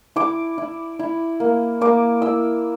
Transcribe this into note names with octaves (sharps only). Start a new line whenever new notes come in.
E4 D6
E4
E4
A#3
A#3 D6
E4 E6